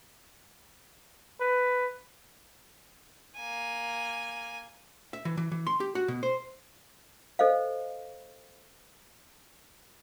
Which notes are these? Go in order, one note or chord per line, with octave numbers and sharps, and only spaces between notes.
B4
A#3 G#5
E5
E3
E3
E3
C6
G4
F#4
B2
C5
A4 C5 D#5 F5